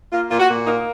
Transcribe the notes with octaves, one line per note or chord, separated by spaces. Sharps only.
A#3 F4
A#2 F4
F#4
A#2
A#3 D#4